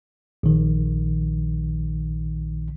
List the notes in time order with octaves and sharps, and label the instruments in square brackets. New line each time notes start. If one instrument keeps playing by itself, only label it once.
[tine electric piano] A#1 D#3